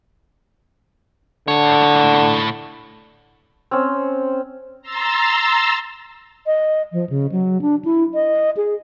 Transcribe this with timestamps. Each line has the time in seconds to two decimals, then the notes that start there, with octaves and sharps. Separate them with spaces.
1.48 A2 D3 C#5
3.71 C4 C#4
4.82 A#5 C6 E6 A6
6.46 D#5
6.92 F3
7.10 C#3
7.32 F#3
7.61 D4
7.85 E4
8.14 D#5
8.57 G#4